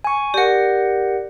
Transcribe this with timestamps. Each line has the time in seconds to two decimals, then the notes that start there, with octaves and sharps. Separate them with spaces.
0.04 G#5 C#6
0.34 G4 A#4 D5 F#5